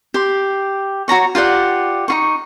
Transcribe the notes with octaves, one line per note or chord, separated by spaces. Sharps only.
G4 C6
F#4 C#5 A#5 C#6
F4 G4 D5 F#5
D#4 F4 C#6